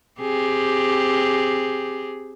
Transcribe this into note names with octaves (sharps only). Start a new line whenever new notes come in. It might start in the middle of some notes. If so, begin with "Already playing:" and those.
C4 G4 G#4